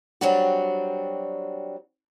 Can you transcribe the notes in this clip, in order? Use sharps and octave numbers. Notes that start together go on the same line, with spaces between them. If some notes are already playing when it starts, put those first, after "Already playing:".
F#3 G3 C4 D4 F#4